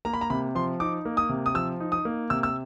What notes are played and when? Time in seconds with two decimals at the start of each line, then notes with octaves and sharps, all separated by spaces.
0.05 A#3 A#5
0.14 B5
0.21 A#5
0.30 C3 B5
0.55 F3 C6
0.80 D#4 D6
1.05 A#3
1.17 D#6
1.29 C3
1.46 D#6
1.54 F3 E6
1.80 D#4
1.92 D#6
2.05 A#3
2.30 C3 E6
2.43 E6